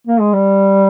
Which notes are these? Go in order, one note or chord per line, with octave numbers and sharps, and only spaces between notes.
A#3
G#3
G3